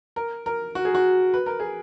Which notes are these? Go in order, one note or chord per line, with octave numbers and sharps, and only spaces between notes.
A#4
A#4
F#4
G#4
F#4
B4
A#4
G#4